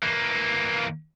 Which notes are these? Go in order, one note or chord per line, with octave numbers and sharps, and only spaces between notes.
E3 A#3